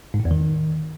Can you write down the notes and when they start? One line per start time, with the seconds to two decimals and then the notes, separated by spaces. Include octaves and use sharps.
0.14 G#2
0.20 A2
0.25 E2
0.31 D#3